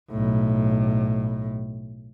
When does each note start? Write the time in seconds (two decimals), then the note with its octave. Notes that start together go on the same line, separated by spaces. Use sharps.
0.12 B1 A2